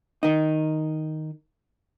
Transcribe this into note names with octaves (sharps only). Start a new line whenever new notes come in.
D#3 D#4